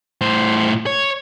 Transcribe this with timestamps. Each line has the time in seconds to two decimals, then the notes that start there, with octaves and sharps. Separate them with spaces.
0.21 A2 C5
0.86 C#5